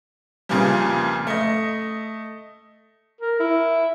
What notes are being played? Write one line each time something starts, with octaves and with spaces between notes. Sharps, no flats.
F2 A#2 C#3 E3 F3 G3
A3 D#5
A#4
E4